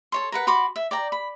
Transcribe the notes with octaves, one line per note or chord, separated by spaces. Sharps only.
A4 C#5 C6
A#4 B4 F#5
F#4 B5 C6 D6
E5
D5 G5 A#5
B5